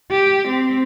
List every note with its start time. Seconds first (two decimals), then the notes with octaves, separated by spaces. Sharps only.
0.11 G4
0.48 C4